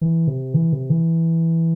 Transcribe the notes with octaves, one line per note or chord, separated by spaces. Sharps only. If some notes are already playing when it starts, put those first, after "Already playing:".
E3
C3
E3
C3
E3